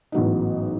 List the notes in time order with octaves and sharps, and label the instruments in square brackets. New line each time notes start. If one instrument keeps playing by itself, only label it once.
[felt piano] A1 G#2 F#3 B3 D#4